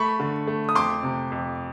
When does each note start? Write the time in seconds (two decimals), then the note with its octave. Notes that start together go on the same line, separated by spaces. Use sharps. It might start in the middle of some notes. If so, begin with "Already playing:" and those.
Already playing: A3 B5 C#6
0.20 D3
0.47 A3
0.69 D#6
0.75 F2 C6 D6
1.03 C3
1.32 F2